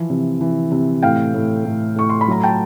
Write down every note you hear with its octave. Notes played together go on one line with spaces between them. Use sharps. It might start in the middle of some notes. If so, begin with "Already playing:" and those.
Already playing: E3 F3
C3
E3
C3
A2 F5 G5
A2
A2
A2 C#6
C6
B5
F#3 A#5
G5 A5